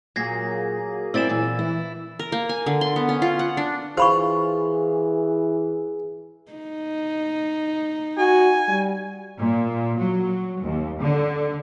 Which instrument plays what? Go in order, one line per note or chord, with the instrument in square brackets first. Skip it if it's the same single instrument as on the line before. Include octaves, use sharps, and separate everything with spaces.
[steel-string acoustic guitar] A#2 [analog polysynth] F#3 A#3 G#4 [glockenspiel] G#6 A#6 C7
[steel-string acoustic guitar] C4 E4 D5 [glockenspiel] E6 A6 E7
[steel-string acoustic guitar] A#2 E3
[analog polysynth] E3 [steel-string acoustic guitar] E4
[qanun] A#4
A#3
G#5
D3
C6
B3
C#4
F4
F#5
D4
[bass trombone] E3 [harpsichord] F4 [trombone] G#4 [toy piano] C5 B5 C#6
[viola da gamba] D#4
[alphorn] F#4 [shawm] G#5
[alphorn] G3
[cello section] A#2
F#3
D#2
D3